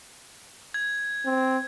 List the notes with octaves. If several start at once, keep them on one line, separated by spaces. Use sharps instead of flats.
G#6
C4